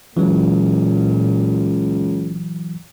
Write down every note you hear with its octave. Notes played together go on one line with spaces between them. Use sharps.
C#2 A#2 E3 F#3